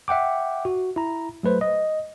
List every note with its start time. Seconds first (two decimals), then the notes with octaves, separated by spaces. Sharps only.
0.08 E5 F#5 G5 D6
0.65 F#4
0.96 E4 A#5
1.43 F#3 A3 B4 C5
1.61 D#5